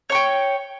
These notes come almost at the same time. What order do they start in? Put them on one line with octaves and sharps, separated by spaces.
C#5 C#6 G5